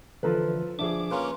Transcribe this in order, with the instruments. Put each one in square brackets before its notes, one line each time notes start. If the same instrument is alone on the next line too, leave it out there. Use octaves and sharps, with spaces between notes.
[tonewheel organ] D3 E3 [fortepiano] F3 A4 B4
[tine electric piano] F3 D4 [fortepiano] G#4 E5 [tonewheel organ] D6
[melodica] A#3 C#4 F4 [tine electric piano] B4